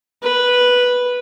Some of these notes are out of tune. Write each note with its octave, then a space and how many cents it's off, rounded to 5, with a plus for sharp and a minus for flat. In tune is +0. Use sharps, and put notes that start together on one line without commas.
B4 -5